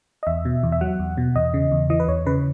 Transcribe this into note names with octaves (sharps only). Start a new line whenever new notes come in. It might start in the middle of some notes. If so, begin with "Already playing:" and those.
D#5
E2 E5
B2
E2
E5
F#3 F#5
E2
B2
E2 D#5
C#3
E2
E3 D#5
B4
E2 C#5
C#3 B4